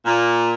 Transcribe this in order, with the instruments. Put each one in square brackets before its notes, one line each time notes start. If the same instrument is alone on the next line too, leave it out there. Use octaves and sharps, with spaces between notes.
[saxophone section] A#2